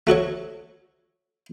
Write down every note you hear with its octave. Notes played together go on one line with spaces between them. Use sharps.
A3 F#4 A4 C#5